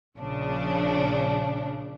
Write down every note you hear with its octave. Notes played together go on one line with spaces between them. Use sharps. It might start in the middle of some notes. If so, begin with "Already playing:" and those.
A#1 C#3 D4